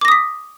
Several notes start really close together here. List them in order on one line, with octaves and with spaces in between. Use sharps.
D6 A#6 D#6 B6